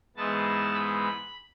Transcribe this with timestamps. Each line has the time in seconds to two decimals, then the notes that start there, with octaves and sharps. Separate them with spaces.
0.16 G#2 E3 G#3 B3 A5
0.74 B5